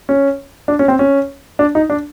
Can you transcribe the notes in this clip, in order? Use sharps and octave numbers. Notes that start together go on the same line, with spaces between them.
C#4
D4
C#4
C4
C#4
D4
D#4
D4